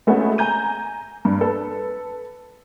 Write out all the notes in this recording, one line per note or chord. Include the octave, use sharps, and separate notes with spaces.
G#3 A3 B3 C#4 F#4
G#5 A#5 G6 D#7
G2
A4 B4